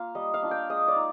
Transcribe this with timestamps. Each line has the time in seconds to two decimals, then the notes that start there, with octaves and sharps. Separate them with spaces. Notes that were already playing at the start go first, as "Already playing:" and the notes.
Already playing: A#3 F4 F5
0.15 G3 D#5
0.34 F5
0.43 D4 F4
0.51 G5
0.69 G#3 D#5
0.88 D5
0.96 D#4